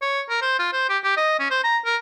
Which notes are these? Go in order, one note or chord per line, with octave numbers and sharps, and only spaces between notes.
C#5
A#4
C5
F4
C5
G4
G4
D#5
C#4
C5
A#5
A#4